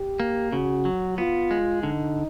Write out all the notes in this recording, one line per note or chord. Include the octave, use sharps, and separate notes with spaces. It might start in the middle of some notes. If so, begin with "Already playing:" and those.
Already playing: G4
A#3
C#3 F#4
F#3
B3 F4
G#3
D3 D#4